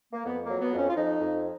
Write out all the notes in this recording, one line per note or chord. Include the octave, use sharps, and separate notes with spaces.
A#3
F2 B3
A#3
F#3
B3
F2
C#4
F4
F2 D#4
F2